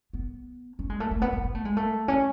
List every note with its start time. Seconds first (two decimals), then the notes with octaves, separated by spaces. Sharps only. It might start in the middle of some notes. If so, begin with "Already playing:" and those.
0.13 B3
0.79 C#4
0.90 G#3
1.00 A3
1.11 A3
1.22 B3
1.33 B3
1.44 B3
1.55 A3
1.65 G#3
1.77 A3
2.08 C#4